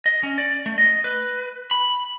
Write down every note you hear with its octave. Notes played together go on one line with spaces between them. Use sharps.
D#5
C#4
D5
A3
D#5
B4
B5